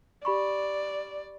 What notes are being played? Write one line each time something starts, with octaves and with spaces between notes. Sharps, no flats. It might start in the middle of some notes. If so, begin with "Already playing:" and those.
G4 D5 B5 C#6